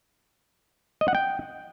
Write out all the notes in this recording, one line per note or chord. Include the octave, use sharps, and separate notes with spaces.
D#5
F#5
G5